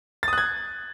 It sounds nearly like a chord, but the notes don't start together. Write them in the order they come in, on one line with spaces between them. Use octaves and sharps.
A6 D#6 F#6 G#6